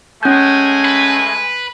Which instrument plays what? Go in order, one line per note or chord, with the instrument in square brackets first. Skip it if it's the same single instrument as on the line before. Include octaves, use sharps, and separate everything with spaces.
[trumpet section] G#3 A3 G#5 [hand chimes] C#4 G6
[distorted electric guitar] B4